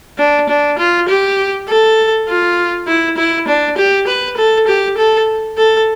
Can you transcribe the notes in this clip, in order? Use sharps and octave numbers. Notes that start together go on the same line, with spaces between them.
D4
D4
F4
G4
A4
F4
E4
E4
D4
G4
B4
A4
G4
A4
A4